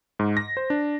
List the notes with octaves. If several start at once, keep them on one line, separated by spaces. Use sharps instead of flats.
G#2
A#6
C5
D4